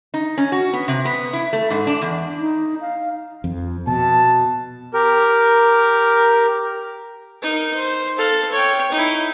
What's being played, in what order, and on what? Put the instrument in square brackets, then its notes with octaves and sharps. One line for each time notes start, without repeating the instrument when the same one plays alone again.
[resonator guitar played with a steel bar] D#4
C#4
F#4
B3
C3
B3
E4
A3
G#2
D4
E2
[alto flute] D#4
F5
[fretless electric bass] F2
[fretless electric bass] B2 [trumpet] A5
[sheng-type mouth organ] G4 A#4
[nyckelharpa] D#4 A#4
C5
A4 F5
C#5 G5
D#4 E4